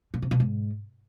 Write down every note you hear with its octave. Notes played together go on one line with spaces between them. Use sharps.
A#2
C3
B2
G#2